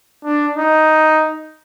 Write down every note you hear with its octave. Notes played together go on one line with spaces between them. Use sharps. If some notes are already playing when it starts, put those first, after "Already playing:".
D4
D#4